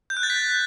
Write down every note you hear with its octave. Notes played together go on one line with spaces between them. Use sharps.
G6
F#6
A6
B6